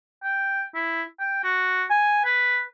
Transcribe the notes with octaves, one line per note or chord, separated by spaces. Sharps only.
G5
E4
G5
F#4
G#5
B4